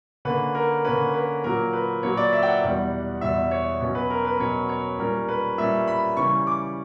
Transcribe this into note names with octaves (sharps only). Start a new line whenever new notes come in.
D3 A#3 C#4 B4
A#4
D3 A#3 C#4 B4
B4
A#2 F#3 A#3 A#4
B4
A#2 F#3 A#3 C#5
D5
E5
G5
F#5
E2 B2 G3
E2 B2 G3 E5
C#5
B2 F#3 C#4
B4
A#4
B4
B2 F#3 C#4 C#5
C#5
A#2 G3 C#4 A#4
B4
A#2 G3 C#4 E5
B5
C#3 E3 G3 C#4 C#6
D6